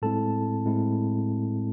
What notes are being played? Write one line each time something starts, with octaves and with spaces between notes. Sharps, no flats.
A2 G#3 C4 E4 A4 A5
A2 G#3 C4 E4